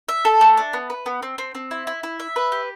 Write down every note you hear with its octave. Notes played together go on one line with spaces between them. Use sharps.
E5
A4
A3
D4
B3
B4
B3
C4
C4
C4
E4
E4
E4
E5
B4
G4